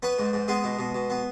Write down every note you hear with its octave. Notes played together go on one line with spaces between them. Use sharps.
B3 C#4 B4
G#2
G#2
G#3 B3 G#4
B2
B2
B2
B3